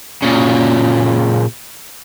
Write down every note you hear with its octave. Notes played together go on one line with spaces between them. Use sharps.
A#2 C#3